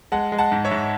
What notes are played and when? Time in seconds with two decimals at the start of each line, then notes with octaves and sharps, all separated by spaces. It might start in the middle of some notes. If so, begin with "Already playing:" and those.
0.12 G#3 F#5 A5
0.32 G#3
0.38 F#5 A5
0.52 G#2
0.65 C#5 E5
0.71 G#2